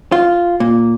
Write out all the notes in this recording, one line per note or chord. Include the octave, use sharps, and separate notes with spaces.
F4
A#2